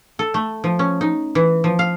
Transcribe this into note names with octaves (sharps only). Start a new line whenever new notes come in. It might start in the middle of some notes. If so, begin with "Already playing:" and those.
A4
A3
F3
C#4
D#4
E3
F3
F5